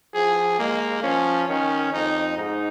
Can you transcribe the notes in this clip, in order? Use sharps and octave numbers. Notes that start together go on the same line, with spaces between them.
F3 G#4
G#3 A#3
F3 C#4
D#3 C#4
F2 D#4
G#2 D#4